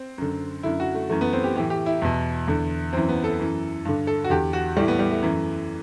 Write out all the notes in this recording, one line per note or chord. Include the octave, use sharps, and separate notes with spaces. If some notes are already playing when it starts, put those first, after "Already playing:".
Already playing: C4
F#2 D3
F#2 D3 E4
F#4
A3
F#2 E3 A3
B3
C4
G4
A2 E3 G4
G4
E4
E2 B2
E2 D3
F#2 E3 C4
B3
A4
F#2 E3
G2 D3
A4
F#4
E2 D3 G4
F#4
A2 E3 G3
B3
G3
A3
F#2 E3